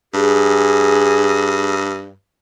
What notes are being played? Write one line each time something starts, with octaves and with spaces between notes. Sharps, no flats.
G2 G#4